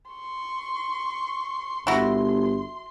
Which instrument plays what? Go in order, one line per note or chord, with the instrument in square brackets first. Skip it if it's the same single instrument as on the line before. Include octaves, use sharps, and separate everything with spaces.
[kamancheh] C6 C#6
[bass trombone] G1 [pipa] E4 F#4 [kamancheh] C6